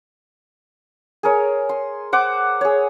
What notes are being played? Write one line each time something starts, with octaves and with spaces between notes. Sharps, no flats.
G#4 A#4 C#5
C6
C5 F#5 D6
G#4 C#5